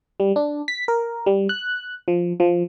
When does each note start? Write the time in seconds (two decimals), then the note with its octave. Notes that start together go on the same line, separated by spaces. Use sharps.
0.20 G3
0.36 D4
0.68 B6
0.88 A#4
1.26 G3
1.49 F#6
2.08 F3
2.40 F3